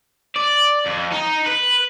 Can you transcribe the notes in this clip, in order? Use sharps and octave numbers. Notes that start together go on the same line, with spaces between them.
D5
F2
D#4
B4